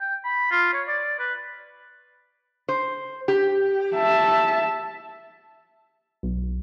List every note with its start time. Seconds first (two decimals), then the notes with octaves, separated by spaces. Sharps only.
0.01 G5
0.24 B5
0.51 F4
0.73 C#5
0.87 D5
1.19 B4
2.68 C5
3.28 G4
3.96 E5 A5
6.23 B1